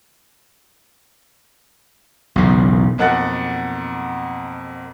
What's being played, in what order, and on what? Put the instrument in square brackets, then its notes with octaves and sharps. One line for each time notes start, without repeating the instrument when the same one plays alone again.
[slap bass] B1 E2 C#3
[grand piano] B1 F2 A#3 F#5 F#6 A6